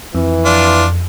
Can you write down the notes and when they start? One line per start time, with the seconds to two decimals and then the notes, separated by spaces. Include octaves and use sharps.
0.15 F2 E3
0.45 D4 F4